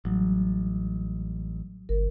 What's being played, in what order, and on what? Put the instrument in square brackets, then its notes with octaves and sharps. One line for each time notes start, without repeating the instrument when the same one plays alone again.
[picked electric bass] A1 [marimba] F#3 G3
[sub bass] G1 [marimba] A#4